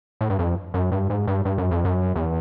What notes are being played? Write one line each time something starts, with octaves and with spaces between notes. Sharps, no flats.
A2
G2
F2
F#2
G2
G#2
G2
G2
F#2
F2
F#2
E2